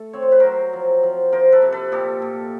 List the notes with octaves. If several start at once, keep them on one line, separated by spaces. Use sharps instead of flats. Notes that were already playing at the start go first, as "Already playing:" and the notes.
Already playing: A3 A4
C4 C#5
C5
B4
F#3 A#4 C5
F3
F3
F3 A#4 C5
A4 B4
C3
A4 B4
A#2 G4 A4
A#2